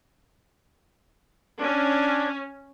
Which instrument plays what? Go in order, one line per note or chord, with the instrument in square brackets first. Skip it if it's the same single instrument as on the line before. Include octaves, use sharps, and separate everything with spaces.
[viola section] C#4 [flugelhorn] D4